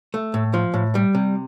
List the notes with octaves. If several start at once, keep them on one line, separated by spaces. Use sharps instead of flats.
A3
A2
F3
A2
G3
C3